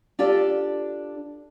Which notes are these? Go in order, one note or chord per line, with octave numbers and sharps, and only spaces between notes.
D4 F4 G4 A4 D5